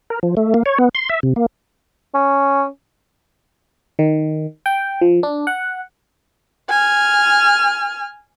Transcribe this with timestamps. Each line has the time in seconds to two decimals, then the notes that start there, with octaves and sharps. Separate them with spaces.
0.10 A#4
0.23 F3
0.37 A3
0.54 A#3
0.66 C#5
0.79 B3
0.95 C6
1.09 E5
1.23 C3
1.36 A#3
2.14 C#4
3.99 D#3
4.66 G5
5.01 F3
5.23 D4
5.47 F#5
6.69 G#5 F6